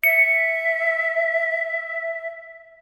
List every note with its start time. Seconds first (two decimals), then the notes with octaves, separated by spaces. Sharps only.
0.04 E5 C#7